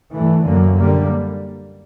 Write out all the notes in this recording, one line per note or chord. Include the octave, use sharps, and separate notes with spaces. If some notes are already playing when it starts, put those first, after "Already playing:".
G2 E3 A3
F#2 D3 F#3 A#3
D3 G3 A#3